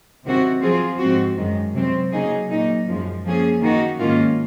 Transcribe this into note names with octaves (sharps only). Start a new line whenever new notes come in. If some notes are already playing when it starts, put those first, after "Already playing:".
C3 D#3 F#3 C4 F#4
F3 C4 F4 G#4
G#2 F3 C4 F#4
F#2 D#3 G#3
C3 F#3 C4
C#3 F#3 A#3 D#4 G#4
A#2 F#3 A#3 D#4
F#2 F3 G#3
F3 A#3 C#4 G#4
D#3 A#3 D#4 F#4
G#2 D#3 A#3 C#4 F4